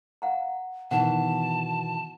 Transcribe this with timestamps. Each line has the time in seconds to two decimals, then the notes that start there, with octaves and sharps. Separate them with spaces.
0.22 F5 F#5 A#5
0.91 B2 D#3 E3 F#5 A5